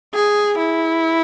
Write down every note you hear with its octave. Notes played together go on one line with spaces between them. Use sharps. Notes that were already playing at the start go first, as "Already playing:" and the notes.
G#4
E4